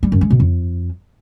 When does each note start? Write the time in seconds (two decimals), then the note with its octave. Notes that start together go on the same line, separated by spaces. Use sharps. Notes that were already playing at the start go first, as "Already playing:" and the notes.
0.03 G3
0.12 F#2
0.21 G#3
0.30 B2
0.40 F2